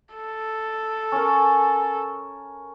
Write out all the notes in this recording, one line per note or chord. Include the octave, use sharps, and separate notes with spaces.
A4
C#4 A#4